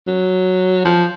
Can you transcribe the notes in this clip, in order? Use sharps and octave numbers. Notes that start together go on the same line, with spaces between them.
F#3
F3